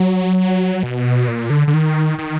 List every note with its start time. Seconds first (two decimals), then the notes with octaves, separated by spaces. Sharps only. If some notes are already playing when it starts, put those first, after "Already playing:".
Already playing: F#3
0.83 B2
1.28 A#2
1.50 D3
1.67 D3
1.74 D#3
2.18 D#3